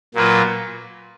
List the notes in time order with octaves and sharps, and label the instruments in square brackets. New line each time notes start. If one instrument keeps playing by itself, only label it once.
[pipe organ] A#2 F#3 A#3 F4 B4